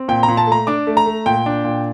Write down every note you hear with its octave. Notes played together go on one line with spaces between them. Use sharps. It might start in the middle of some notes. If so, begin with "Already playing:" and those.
Already playing: C4
A#2 G5
A#5
A#2
A5
A3 A#5
D4 D6
A3
A#5
A3
A#2 G5
D4
A#2